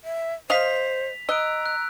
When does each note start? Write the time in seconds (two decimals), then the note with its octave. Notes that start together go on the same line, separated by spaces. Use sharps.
0.04 E5
0.50 C5 D#5 F5 B6 F7
1.29 D#5 A#5 E6 F#6 D7
1.66 F#6